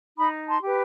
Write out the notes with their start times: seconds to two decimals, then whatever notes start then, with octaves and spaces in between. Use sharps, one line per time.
0.18 D#4 B5 D#6
0.47 A5 C6
0.62 G4 B4